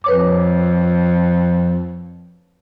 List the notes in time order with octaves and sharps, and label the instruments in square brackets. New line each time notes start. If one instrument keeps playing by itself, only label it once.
[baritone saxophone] F2 [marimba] B4 C#5 D6